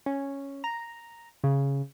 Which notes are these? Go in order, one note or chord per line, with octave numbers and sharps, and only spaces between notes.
C#4
A#5
C#3